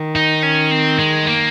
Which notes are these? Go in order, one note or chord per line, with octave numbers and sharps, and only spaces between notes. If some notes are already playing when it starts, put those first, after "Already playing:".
Already playing: D#3
D#4
C#4
C4
G#3
A#3